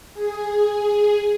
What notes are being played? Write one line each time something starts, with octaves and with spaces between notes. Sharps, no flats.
G#4